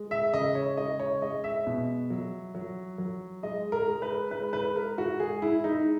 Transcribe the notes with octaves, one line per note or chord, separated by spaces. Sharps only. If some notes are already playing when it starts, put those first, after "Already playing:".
Already playing: G#3
E5
C#3 D#5
C#5
G#3 D#5
C#5
G#3 D#5
E5
B2
F#3
F#3
F#3
G#3 D#5
A#4
G#3
B4
G#3 B4
B4
G#3 A#4
F#4
G#3 G#4
E4
G#3 D#4